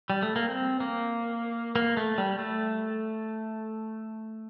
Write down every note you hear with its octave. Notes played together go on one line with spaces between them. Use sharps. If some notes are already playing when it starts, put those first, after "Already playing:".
G3
A3
A#3
C4
A#3
A#3
A3
G3
A3